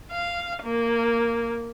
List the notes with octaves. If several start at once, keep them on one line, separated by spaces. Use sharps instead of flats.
F5
A#3